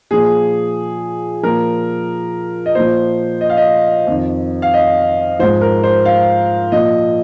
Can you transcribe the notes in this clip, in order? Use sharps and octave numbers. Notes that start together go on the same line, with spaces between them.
A#2 F3 G#4
A#2 F3 A#4
D#5
A#2 F3 C5
D#5
F5
D#5
F2 D#3
F5
D#5
G#2 F3 C5
A#4
C5
F5
A#2 F3 D#5